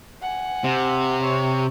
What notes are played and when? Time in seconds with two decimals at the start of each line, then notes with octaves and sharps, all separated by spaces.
0.22 F#5 G#5
0.64 C3
1.24 C#5